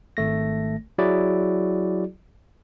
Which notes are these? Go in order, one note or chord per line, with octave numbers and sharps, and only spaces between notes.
G#1 A3 A#6
F#3 E4 F#4 G#4 D5